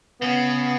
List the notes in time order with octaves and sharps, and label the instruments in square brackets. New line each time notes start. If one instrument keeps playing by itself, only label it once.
[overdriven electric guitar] C#3 [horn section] B3